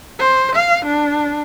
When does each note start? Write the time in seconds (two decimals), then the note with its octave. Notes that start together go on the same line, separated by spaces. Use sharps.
0.19 C5
0.55 F5
0.85 D4